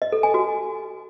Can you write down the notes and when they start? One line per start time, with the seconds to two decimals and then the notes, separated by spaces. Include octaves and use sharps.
0.02 D#5
0.12 A4
0.23 G#5
0.34 F#4